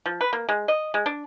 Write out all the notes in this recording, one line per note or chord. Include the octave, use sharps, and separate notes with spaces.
F3
B4
A#3
G#3
D#5
G#3
D4